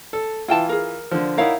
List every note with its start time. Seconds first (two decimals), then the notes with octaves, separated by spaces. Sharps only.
0.13 A4
0.48 E3 E4 F4 G5 A5
0.69 G#4 A#4
1.11 D3 F3
1.38 D#4 E4 A#4 C#5 F5 F#5